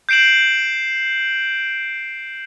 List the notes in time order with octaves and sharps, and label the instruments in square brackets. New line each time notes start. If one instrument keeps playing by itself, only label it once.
[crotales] G6 C7 D7 E7 F#7